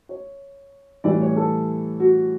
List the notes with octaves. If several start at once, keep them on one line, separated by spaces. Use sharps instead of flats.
C#5
A2 E3 G3 D5
C#5
A4
F#4